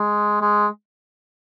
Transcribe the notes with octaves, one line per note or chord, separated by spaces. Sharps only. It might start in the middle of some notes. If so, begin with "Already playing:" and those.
Already playing: G#3
G#3